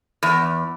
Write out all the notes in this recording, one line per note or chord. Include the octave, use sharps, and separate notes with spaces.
E2